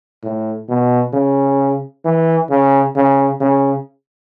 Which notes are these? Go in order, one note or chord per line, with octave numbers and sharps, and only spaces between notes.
A2
B2
C#3
E3
C#3
C#3
C#3